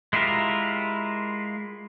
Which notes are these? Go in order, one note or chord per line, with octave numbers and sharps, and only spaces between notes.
G#3 E4 F4 G4 A#4